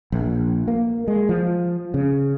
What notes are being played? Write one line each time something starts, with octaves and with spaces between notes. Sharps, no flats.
A#1
A#3
G#3
F3
C#3